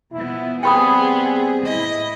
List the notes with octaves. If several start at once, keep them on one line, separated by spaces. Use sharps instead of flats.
B2 F3 B3 E4
G3 B3 C4 G#4 G5 B5 D#6
A2 E4 D#5